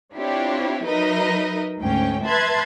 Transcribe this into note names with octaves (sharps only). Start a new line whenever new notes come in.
C4 D4 E4 F4 G4 C#5
F#3 D#4 A#4 B4 D#5 E5
D2 G#2 C#4 G5
B4 E5 A5 C6 F#6 G#6